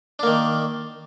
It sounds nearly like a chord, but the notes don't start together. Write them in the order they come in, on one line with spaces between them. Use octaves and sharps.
D4 A#3 D#3